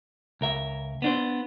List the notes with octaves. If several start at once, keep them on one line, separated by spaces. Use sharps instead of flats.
C#2 A#4 E5
B3 D4 C5